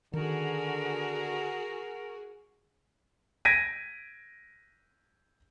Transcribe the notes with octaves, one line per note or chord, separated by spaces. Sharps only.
D3 D#3 F#4 G#4 A#4
G#6 A#6 B6 D7 D#7